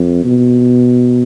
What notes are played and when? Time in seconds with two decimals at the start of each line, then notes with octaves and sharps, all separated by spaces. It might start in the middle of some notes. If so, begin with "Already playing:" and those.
Already playing: F2
0.25 B2